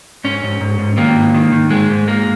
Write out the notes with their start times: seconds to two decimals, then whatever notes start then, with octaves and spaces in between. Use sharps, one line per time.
0.24 G#2 C#4
0.43 G#2
0.61 G#2
0.79 G#2
0.97 D#3 A#3
1.16 G#2
1.34 D#3
1.52 D#3
1.71 G#2 G#3
1.89 G#2
2.07 G#3 A#3